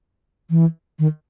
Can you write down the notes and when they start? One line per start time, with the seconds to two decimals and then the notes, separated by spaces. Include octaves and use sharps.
0.50 E3
0.99 D#3